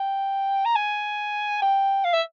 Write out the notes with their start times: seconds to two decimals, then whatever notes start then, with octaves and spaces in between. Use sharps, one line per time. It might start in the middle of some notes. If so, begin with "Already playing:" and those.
Already playing: G5
0.65 A#5
0.76 G#5
1.62 G5
2.05 F5
2.14 E5